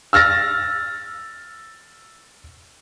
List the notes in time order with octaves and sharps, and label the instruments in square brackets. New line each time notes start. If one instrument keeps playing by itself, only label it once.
[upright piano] E6 F6 A6 A#6